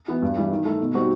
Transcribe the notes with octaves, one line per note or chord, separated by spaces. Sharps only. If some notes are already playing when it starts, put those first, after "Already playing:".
E3 B3
G2
E3 G3
D#3
A3 E4
B2
G3 C4 D#4 F#4